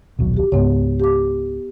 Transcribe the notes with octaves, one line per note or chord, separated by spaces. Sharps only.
D#1 B1 F#3
F#4 G4
C#2 G#2 B3 C#5
G4 D6